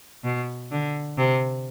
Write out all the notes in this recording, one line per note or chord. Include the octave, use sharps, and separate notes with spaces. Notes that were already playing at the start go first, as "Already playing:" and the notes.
B2
D3
C3